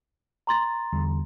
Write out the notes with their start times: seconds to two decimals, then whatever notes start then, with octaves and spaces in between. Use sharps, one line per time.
0.47 A#5 C6 A6
0.93 E2 D3 G3